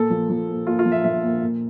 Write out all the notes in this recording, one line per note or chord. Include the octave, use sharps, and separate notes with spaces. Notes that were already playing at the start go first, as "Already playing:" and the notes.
Already playing: A#2 A4
F3
F3
A#2
A#2 F4
F4
F3
E5
F3 E5
A#2
A#2